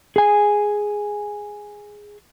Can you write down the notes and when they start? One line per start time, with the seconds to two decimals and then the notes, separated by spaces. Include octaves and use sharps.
0.16 G#4 G#5